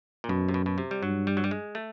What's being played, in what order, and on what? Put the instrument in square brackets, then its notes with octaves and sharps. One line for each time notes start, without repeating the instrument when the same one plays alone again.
[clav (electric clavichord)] A#2
[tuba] F#2 [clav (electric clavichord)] B2
[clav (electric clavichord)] C3
B2
B2
C3
G3
[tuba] G2 [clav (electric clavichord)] F#3
[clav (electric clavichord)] G3
F#3
G3
G#3
A3